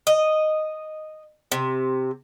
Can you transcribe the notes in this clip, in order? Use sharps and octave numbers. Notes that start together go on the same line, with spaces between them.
D#5
C3